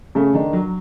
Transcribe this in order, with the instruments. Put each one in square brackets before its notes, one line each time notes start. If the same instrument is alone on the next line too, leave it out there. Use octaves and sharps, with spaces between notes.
[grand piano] C#3 [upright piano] A3
[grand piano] D#3 [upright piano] D4
[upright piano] F#3